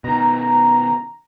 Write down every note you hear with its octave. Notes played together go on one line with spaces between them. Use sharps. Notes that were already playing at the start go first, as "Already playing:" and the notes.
B2 D#3 A#5